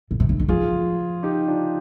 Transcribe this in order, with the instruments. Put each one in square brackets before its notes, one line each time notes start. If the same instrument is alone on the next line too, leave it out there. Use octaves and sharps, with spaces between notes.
[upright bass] B2
C3
D3
D#3
[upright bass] F3 [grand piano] F4 G#4
[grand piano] D#4 G4
D4 F4